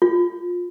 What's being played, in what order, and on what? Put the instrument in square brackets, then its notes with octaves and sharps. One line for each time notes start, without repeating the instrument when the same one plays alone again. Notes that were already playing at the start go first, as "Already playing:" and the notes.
[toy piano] F4